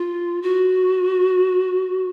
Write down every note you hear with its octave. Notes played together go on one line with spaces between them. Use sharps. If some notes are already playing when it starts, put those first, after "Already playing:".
Already playing: F4
F#4